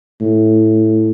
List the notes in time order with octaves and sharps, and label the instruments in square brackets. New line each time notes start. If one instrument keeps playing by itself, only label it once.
[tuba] A2